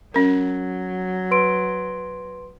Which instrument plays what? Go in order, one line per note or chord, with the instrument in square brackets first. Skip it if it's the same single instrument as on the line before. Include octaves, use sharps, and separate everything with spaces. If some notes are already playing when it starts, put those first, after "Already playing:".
[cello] F#3 [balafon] C#4 A#4
[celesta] B4 C6 D7